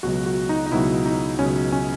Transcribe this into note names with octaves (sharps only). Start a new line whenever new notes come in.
C#2 B2 F#3 F#4
F#4
D#4
D#4
C#2 B2 F#3 E4
D#4
C#2 B2 F#3 C#4
C#4